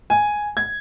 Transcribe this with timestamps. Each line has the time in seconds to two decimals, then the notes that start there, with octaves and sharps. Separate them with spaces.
0.10 G#5
0.57 G#6